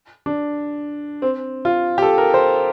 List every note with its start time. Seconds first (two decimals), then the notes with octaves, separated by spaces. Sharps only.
0.26 D4
1.22 C4
1.65 F4
1.98 G4
2.02 A4
2.18 A#4
2.34 C5